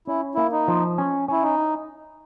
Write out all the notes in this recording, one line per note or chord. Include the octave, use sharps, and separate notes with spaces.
C#4 E4
A#3 E4
D#4
F3
C#4
C#4 E4
D#4